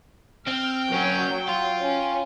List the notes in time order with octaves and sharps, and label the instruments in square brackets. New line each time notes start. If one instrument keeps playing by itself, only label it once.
[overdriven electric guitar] C4 [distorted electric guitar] G5 [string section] F6
[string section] F#3 [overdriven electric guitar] A#3 C#4
[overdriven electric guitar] F4
[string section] C#4